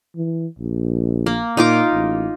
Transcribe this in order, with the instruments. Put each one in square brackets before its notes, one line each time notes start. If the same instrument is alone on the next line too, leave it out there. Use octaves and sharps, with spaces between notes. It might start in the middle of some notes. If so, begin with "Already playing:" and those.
[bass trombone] E3
A#1
[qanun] A#3
[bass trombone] A#2 [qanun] D#4 F4 D6
[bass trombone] A1